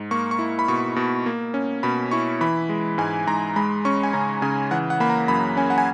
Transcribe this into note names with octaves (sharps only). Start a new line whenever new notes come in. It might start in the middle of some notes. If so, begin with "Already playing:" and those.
Already playing: G#2
A#3 C#6
C#6
E4
B5
B2 C#6
B2
A#3
C#4
B2 B5
E4 C#6
E3 B5
G#3
G#2 G#5
G#2 A#5
G#3 B5
C#4 C#6
G#5
C#3 A#5
C#3 G#5
E3 F#5
F#5
A#3 B5
A#5
F#2 B5
C#4 G#5
F#5
G#5